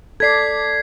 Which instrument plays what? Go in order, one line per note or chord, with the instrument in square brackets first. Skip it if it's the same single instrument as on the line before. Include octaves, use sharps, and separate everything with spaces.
[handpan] A4 D5 [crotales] G#6 B6 C7